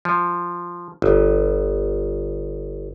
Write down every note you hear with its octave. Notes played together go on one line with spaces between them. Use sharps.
F3
G1